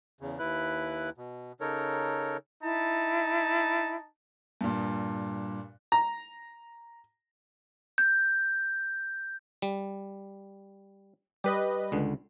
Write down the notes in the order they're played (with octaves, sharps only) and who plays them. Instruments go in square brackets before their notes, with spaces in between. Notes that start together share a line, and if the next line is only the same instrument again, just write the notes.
[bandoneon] E2 C#3
D#2 E4 B4 F#6
B2
C#3 D#4 A4 A#4 C#5
[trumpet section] D#4 A5 [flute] E4
[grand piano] G2 A#2
[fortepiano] A#5
[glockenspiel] G6
[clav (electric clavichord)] G3
[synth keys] G3 B4 D#5 [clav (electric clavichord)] G4
[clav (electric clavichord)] C#2 D3